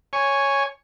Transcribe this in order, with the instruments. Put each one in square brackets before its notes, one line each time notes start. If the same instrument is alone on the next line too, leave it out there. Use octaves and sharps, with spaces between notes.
[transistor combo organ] C#5 G#5